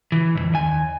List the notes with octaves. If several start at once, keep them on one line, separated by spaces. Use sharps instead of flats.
E3
B1 F2
D#2 G#5